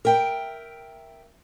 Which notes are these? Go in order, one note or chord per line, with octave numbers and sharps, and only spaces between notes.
A#4 E5 G5